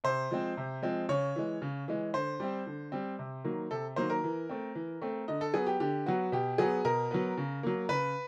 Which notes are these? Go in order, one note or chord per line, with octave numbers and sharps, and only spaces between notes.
C3 C5
F3 G#3 C4
C3
F3 G#3 C4
C#3 C#5
E3 G#3
C#3
E3 G#3
D3 C5
G3 C4
D3
G3 C4
C3
D#3 F#3 A#3
C3 A4
D#3 F#3 A#3 C5
A#4
E3
A3 C4
E3
A3 C4
D3 D#5
A4
F#3 B3 G#4
G4
D3 G4
F#3 B3 F#4
B2 G4
F#3 B3 G#4
B2 A#4
F#3 B3
C#3
F#3 A#3
C#3 B4